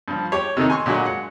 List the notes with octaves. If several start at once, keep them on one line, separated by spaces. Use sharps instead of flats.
G2 F3
G4 C#5
C3 D#3 A3 D#4
G#5 C6 C#6
A#2 D3 F#3 G#3 F#4
F#5